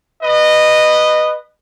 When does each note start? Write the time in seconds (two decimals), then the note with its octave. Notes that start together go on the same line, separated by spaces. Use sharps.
0.22 B4 D#5